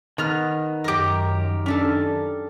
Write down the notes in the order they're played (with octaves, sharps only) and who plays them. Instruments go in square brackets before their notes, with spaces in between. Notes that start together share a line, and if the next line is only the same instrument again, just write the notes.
[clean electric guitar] D#3 [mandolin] B3 F6
[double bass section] F#2 [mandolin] G4 A#4
[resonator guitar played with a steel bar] C#4 D4 A4